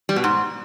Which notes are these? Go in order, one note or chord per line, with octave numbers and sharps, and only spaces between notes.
G3
B2
G#2